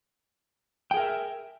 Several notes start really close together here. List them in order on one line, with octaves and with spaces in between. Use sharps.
G5 G#4 A#4 E5